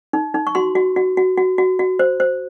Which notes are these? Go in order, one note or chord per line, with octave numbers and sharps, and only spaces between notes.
D#4
D#4
C#6
F#4 C6
F#4
F#4
F#4
F#4
F#4
F#4
C5
C5